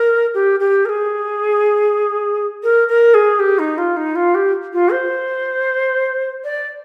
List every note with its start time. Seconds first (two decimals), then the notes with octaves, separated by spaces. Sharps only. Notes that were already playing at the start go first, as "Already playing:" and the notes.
Already playing: A#4
0.34 G4
0.59 G4
0.85 A#4
0.89 G#4
2.63 A#4
2.88 A#4
3.14 G#4
3.39 G4
3.59 D#4
3.77 F4
3.96 D#4
4.15 F4
4.34 G4
4.73 F4
4.91 C5
6.44 D5